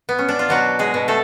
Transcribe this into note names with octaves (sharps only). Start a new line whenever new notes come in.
B3
C#4
D4
F4
B2 F#3 F#4
G#3 G#4
B2
A3 A4